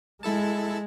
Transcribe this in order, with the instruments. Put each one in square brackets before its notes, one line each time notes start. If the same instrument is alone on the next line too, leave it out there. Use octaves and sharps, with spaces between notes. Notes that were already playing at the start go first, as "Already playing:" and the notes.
[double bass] G#3 [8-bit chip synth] E4 A4 A5